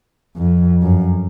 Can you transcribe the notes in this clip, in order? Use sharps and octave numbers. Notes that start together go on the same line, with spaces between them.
F2
F#2